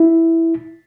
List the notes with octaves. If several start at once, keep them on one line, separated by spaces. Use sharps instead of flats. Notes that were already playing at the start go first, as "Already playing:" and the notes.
Already playing: E4